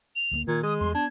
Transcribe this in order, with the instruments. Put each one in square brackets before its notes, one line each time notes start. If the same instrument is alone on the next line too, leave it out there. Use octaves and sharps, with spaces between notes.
[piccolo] F7
[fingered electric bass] D2 F#3 A#3
[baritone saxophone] A#2 [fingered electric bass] D#3 [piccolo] G#6
[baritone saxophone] G#3 [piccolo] D#6
[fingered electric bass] E2 G3 [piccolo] C6
[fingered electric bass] B3 [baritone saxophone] D4 [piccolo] G#6